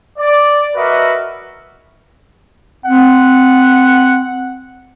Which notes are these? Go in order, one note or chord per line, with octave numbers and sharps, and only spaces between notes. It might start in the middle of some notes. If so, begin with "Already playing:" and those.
D5
F#4 A#4 B4 D#5 E5
C4 F#5